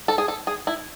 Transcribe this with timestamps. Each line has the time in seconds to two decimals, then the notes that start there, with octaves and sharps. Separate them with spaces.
0.08 A4
0.18 G#4
0.28 A4
0.47 G#4
0.67 E4